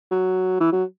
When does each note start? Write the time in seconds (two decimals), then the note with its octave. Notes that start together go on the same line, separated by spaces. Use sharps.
0.11 F#3
0.60 E3
0.73 F#3